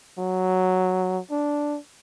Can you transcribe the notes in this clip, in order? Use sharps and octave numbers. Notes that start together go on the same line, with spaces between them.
F#3
D4